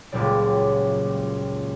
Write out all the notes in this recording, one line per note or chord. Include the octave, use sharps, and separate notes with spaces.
F#1 C#2 A#2 G3 D5